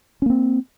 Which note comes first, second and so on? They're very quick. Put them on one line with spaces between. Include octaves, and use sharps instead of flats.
C#4 A#3 C4